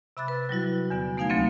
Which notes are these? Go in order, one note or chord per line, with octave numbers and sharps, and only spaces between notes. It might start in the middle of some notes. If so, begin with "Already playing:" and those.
C3 E5 B5 D6 F#6 A6
B4
F#3 G3 E4 F#4
E2 D3 B3
A3 B3 D#4 F5 G#5 G#6
D2 F#3 A#3 C4 C#4